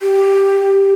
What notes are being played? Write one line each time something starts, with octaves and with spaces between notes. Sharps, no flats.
G4